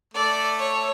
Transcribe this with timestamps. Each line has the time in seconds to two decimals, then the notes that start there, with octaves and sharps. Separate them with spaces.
0.14 A3 D5
0.59 C#5